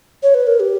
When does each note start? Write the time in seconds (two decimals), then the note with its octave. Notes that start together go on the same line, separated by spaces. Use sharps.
0.23 C#5
0.34 B4
0.47 A#4
0.60 G4